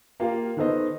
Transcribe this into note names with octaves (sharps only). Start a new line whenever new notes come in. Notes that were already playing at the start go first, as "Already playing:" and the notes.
A#3 F4 G4 A#4
D#3 B3 A4 C5 D#5